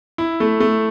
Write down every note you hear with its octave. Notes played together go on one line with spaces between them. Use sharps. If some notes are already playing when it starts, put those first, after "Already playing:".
E4
A3
A3